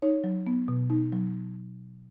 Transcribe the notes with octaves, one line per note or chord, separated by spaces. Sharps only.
D#4 C#5
F#3
B3
B2
D#4
F#3